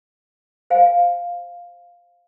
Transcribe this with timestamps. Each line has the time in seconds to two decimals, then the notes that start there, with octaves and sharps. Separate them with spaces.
0.70 C5 F5 G#5